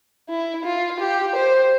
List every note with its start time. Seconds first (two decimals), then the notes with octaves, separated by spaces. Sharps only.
0.29 E4
0.65 F4
1.00 G4
1.35 C5